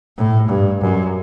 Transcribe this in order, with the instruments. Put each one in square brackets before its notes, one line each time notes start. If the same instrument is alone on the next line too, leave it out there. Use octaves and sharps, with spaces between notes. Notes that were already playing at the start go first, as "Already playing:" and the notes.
[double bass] A2
G2
F#2